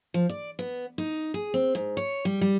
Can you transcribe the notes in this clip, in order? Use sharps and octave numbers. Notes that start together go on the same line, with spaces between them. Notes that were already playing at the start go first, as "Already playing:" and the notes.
F3
D5
B3
D#4
G#4
C4
G#2
C#5
G3
G3